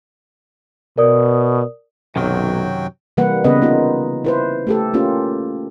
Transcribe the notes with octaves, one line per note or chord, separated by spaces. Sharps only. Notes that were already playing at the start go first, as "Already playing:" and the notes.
B2 A#4 D5 D#6
B1 F#2 C3 D#3 F#3 F#4 G5
C3 E3 G3 A#3 B4 F#5
C#3 B3 B4 D#5
A#3 D#4 F4
E4 B4 C5
A3 G4 A4
A#3 C#4 F4 G4